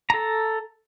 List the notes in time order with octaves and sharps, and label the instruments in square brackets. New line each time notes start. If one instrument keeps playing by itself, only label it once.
[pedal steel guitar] A4 A#5